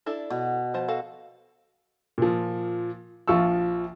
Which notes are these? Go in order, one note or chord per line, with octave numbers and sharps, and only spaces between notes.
D4 E4 A4
B2
F3 C5 A5
F#4 A4 F5
A#2 F3
A#1 F3 F4 C#6 E6